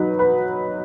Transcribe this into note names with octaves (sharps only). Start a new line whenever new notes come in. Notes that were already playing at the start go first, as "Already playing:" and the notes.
Already playing: F#3 D#4 B4
B4